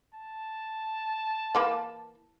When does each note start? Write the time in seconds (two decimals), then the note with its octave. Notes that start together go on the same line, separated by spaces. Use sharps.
0.14 A5
1.55 E3 A#3 B4